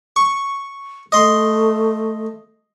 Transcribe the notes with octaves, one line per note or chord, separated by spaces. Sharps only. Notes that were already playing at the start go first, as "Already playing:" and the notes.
C#6
A3 D#5 C6